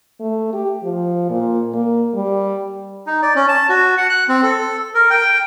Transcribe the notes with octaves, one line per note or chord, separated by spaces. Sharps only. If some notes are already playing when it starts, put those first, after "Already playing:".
A3
G4
F3
A#2
A#3
G3
D#4
D5
C#4
A5
F#4
F#5
F#6
C4
A4
A#4
G5